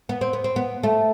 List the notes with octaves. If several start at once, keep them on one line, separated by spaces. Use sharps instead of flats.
B3
C4
B3
C4
B3
A3